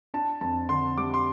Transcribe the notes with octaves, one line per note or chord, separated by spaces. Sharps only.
D4 A5
F2 A5
D3 C6
G3 D6
C6